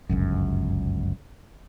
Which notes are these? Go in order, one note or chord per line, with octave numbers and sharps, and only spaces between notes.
G1 C#2 F#2